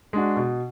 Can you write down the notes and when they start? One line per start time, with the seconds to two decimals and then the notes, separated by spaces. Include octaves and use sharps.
0.13 G#3 D4 F#4
0.36 B2